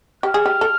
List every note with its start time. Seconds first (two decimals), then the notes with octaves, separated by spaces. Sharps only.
0.23 G4 F6
0.34 G#4
0.46 G4
0.61 A4